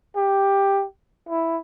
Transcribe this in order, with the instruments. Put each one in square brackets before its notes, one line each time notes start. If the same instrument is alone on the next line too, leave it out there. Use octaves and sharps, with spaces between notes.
[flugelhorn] G4
E4